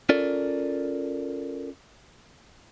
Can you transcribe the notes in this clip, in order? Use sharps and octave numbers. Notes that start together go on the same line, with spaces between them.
C#4 F4 A4 A#4 D5